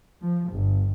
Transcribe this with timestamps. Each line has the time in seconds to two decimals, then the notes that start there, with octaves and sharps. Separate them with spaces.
0.22 F3
0.51 G1